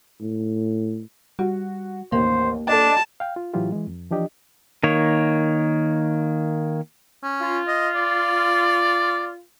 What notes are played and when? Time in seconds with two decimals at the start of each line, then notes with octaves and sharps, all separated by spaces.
0.20 A2
1.39 G3 F#4
2.12 A1 D#2 A#3 C5
2.68 D4 A4 D#5 A5
3.20 F5 G5
3.36 F4
3.54 A2 E3 F#3 E4 F4 G4
3.72 E3 G#3
3.87 F2
4.11 E3 F3 D4 G4 D#5
4.83 D#3 A#3 C#5
7.23 C#4
7.40 F4
7.68 D#5
7.95 D5